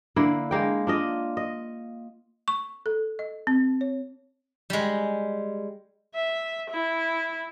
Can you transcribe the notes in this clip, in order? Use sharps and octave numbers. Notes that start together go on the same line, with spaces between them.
D3 A#3 E4
G#3 A#3 G5
D4 F4 D#5
D#5
C#6
A4
D#5
C4
C#5
G3 G#3
E5
E4